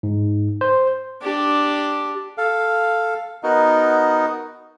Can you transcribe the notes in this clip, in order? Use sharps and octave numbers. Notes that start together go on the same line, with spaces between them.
G#2
C5
D4 G4
A4 F5
B3 D#4 F#4 A#4 D#5